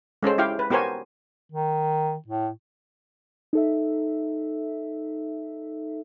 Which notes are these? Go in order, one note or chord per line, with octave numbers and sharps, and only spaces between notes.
G#3 C#4 A4 C5
E4 G4 F5 G5
B4
B3 G4 A#4 C5 C#5 G#5
D#3
A2
D#4 A4 E5